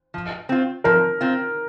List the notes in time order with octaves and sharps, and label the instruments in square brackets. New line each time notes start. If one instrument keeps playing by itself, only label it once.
[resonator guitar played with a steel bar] F3
C4 F4
[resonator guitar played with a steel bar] F3 [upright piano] A#4
[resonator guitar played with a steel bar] C4 F4